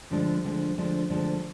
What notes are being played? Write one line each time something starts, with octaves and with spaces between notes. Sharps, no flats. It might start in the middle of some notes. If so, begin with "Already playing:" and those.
D2 D3 F3 G#3 D4
D2 D3 F3 G#3 D4
D2 D3 F3 G#3 D4
D2 D3 F3 G#3 D4